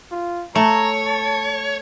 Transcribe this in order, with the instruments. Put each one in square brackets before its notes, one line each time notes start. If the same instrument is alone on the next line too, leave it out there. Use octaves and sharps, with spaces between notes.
[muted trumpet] F4
[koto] A3 [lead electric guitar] C#5 [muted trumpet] A#5
[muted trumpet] A5